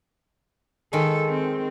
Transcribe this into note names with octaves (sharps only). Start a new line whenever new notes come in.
D#3 G#3 A4
C4